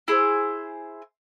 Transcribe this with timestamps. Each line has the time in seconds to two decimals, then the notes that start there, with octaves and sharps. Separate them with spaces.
0.08 E4 G#4 C5